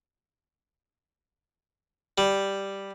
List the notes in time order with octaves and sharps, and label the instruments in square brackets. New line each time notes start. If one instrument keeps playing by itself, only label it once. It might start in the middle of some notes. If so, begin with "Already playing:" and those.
[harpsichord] G3